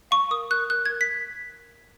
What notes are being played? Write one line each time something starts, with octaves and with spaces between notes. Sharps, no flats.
F5 C#6
A#4 D#6
A#4 F#6
A#4 F#6
A#4 G#6
B6